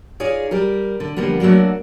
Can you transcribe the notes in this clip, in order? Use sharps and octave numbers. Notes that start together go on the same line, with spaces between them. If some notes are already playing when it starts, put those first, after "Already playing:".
D#4 F4 G#4 C#5 D5
G3 G4 A#4
D3
D3 F3 G3 A#3 B3
F#3 A3 A#3 D4 F#4